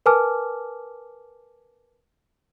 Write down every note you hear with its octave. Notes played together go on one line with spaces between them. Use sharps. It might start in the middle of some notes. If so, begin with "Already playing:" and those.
A#4 B4 G#5 A5 D6 F6